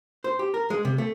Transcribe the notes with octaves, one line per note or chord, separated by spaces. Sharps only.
C5
G4
A#4
G#3
C3
A3